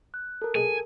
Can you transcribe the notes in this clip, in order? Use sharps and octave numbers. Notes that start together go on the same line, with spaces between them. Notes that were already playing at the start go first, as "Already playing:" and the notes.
F#6
A4 A#4
B1 G#3 G#4 G#5